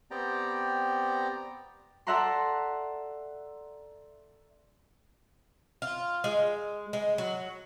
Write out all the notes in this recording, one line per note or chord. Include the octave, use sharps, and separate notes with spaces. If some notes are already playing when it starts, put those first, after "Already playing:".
B3 C4 G4 D5 G5 A#5
A4 D5 E5 F#5 A#5 C6
F4
G#3
G#3
F#3